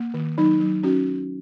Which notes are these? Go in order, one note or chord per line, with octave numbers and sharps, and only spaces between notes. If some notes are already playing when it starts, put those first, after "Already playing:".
Already playing: A#3
D#3
F#3 D#4
F#3
C#4 F#4